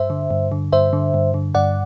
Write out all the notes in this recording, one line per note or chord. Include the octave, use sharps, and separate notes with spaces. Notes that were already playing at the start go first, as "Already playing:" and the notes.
Already playing: G2 C5 E5
D3
G2
D3
G2 C5 E5
D3
G2
D3
G2 D5 F#5